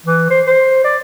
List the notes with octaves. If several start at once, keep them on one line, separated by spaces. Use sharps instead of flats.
E3
C5
C5
D5